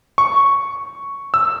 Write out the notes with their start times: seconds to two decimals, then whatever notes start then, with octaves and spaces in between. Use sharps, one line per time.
0.18 C#6
1.34 E6